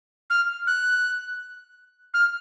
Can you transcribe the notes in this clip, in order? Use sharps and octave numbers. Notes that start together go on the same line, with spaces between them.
F6
F#6
F6